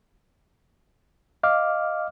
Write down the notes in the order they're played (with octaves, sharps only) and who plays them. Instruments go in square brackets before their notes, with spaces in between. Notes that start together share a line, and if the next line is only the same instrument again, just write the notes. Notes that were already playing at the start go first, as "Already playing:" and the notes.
[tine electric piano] D#5 F5 D6 F6